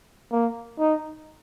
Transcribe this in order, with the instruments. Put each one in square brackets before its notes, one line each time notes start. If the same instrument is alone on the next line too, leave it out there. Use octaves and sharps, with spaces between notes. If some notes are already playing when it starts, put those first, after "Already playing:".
[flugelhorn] A#3
D#4